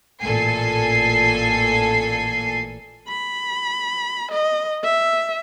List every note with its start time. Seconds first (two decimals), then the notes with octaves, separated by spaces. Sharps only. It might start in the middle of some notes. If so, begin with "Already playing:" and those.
0.22 A1 A#2 A4 G#5 C7
3.08 B5
4.32 D#5
4.84 E5